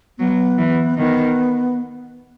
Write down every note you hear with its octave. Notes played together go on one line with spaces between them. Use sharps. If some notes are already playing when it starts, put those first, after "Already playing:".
F#3 B3
E3
D#3 B3